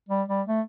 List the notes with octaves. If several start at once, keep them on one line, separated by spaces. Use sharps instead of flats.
G3
G3
A3